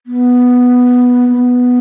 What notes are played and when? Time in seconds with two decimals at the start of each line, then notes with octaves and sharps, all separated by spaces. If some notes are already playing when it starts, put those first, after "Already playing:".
0.07 B3
1.29 B3